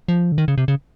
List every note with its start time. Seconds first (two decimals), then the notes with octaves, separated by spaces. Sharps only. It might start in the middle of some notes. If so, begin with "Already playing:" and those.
0.08 F3
0.32 D3
0.38 D#3
0.48 C#3
0.58 C3
0.68 C#3